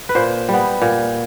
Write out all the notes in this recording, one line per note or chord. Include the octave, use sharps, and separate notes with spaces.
B4
A#2 C5
G3 B3
A#2